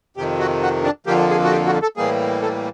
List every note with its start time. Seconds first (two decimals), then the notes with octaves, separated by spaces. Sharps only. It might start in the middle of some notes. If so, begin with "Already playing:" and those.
0.17 F2 C3 D#3 G4
0.40 F#4
0.62 F#4
0.84 D4
1.06 F2 D3 F3 A#3 G4
1.30 G#4
1.44 F#4
1.52 G4
1.66 F#4
1.82 A4
1.97 A2 E3 G3 A#3 G#4
2.42 A4